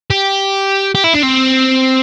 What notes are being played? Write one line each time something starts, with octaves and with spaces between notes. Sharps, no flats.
G4
G4
E4
D4
C4